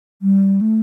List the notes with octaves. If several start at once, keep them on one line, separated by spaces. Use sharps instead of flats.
G3
A3